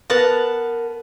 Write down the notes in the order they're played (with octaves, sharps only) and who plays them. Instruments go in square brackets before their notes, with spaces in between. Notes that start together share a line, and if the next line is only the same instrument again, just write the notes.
[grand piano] B3 [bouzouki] A#4 F#5 A5